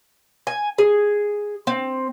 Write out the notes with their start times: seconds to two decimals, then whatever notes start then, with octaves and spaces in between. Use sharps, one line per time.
0.47 G#5
0.78 G#4
1.67 C4